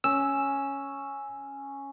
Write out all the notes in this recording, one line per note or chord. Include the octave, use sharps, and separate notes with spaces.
C#4 E6